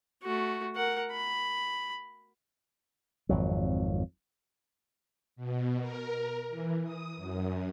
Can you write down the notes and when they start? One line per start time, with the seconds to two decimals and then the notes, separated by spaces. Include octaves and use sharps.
0.23 A3 F#4
0.75 A#4 F#5
1.12 B5
3.29 G#1 F2 F#3
5.36 B2
5.80 A#4
6.50 E3
6.84 D#6
7.17 F#2